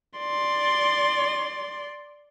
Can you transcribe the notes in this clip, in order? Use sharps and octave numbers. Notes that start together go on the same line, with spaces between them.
D5 C6